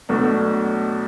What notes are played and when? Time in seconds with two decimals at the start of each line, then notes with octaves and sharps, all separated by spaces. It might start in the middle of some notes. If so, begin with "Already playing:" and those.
0.09 B1 B2 A3 D4